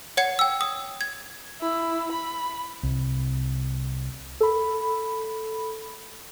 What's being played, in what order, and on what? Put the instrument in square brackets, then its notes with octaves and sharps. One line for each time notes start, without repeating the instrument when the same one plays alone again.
[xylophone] C#5 F#5 G#6 C#7
G5 E6
D#6
G#6
[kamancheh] E4
B5
[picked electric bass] C2
[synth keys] A4 B5